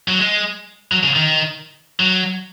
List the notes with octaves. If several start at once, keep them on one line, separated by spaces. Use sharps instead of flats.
F#3
G#3
F#3
C#3
D#3
F#3